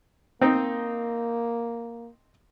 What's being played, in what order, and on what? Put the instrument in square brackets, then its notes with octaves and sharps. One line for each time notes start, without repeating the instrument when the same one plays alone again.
[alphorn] A#3 [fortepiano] C4 D#4